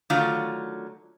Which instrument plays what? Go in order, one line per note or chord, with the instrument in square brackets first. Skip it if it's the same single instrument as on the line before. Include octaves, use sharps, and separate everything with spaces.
[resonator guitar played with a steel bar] D3 D#3 F#3 A3 F4